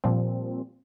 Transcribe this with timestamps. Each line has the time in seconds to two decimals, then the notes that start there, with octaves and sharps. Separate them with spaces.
0.04 A#2 F3 G3 C4